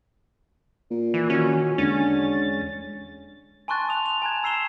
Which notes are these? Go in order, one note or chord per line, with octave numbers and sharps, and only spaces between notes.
A#2
E3
D#3 C#4 F#4
E2 D3 G#3 C#4 A6
G#5 A5 C6 C#6 F#6 A6
D#6 F7
F7
G#5 A#5 F#6 G#6
A#5 E6 C7 E7 G7